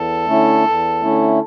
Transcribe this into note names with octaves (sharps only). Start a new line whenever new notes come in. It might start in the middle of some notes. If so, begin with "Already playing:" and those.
Already playing: E2 A4
D3 A3 C#4 E4
E2
D3 A3 C#4 E4